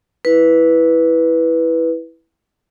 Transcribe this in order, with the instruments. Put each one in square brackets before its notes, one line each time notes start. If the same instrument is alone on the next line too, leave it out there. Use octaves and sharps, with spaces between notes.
[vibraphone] E4 B4